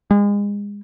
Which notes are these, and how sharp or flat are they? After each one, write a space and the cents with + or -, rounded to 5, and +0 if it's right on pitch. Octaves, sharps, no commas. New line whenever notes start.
G#3 -30